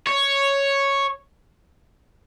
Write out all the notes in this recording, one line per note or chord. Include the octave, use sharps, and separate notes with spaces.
C#5